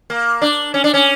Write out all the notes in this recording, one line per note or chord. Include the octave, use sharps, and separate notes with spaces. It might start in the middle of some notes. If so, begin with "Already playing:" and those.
A#3
D4
C#4
D4
C#4